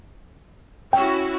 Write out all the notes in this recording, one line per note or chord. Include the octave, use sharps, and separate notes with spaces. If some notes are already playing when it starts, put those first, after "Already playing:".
C#4 E4 F#4 G5